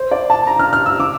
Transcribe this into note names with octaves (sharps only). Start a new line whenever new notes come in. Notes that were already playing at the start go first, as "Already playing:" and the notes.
Already playing: C5
D5
A5
A#5
F6
F6
E6
D6